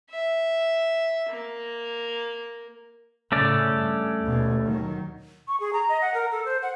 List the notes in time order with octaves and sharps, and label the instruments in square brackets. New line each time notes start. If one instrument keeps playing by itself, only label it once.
[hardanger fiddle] E5
A#3
[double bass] A2 C#3 [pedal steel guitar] A3 C#4 D5
[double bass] G2
D#2 B2
D#3 F#3
[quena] C#6
G#4
A#5
D#5
F#5
A#4
A4
C5
F#5